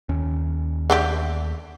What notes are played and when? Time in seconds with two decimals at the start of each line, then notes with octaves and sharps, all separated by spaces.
0.09 D#2 C#4
0.90 D3 A3 G4